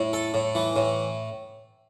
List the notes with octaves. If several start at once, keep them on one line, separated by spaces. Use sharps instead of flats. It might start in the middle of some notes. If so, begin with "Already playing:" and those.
Already playing: A2
A4
A2
E3
A2